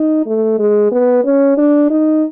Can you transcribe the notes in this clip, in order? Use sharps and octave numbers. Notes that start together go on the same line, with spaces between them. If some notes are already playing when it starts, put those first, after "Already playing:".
Already playing: D#4
A3
G#3
B3
C#4
D4
D#4